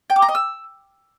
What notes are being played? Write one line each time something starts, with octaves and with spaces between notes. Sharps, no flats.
G5
D6
A#5
D#5
E6